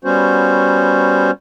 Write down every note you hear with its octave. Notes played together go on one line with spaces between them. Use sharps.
G3 B3 C#4 F#4 C5